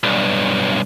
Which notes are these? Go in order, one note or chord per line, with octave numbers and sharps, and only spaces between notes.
B1 G2